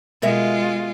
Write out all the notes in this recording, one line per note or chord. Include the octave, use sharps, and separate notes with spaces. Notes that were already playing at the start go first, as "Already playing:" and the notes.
B2 G#3 F4 A#4 E5